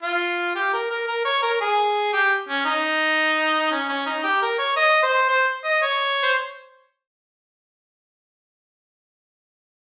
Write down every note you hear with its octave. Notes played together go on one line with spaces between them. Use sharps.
F4
G4
A#4
A#4
A#4
C#5
A#4
G#4
G4
C#4
D#4
C#4
C#4
D#4
G4
A#4
C#5
D#5
C5
C5
D#5
C#5
C5